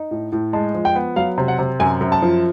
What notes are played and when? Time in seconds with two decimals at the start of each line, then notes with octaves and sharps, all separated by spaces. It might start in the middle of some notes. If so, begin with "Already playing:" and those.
Already playing: D#4
0.11 A2
0.32 A2
0.53 G#3 A5
0.75 F3
0.85 G5
0.95 B3
1.16 F#3 F5
1.38 C3
1.48 F#5
1.59 C3
1.80 F#2 G#5
2.01 F#2
2.12 A5
2.22 F3